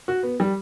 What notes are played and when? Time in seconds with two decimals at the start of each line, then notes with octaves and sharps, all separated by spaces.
0.08 F#4
0.23 B3
0.40 G3